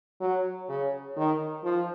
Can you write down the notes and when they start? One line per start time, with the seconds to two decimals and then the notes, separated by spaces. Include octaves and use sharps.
0.21 F#3
0.69 C#3
1.16 D#3
1.64 F3